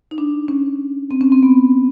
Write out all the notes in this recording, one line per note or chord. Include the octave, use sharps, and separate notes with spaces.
D#4
D4
C#4
C4
C#4
C4
B3